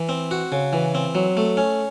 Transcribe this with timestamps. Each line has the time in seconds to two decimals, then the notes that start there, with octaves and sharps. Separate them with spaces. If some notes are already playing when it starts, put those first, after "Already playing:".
Already playing: E3
0.09 C4
0.31 F#4
0.52 C#3
0.73 E3
0.95 C4
1.15 F#3
1.37 A3
1.57 C#4